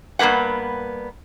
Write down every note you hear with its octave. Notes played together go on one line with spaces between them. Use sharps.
G2 E3 A#3 B3 F#5